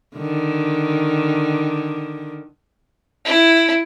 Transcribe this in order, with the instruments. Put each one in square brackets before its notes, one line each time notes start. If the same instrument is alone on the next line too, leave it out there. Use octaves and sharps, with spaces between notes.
[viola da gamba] D3 D#3
[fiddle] E4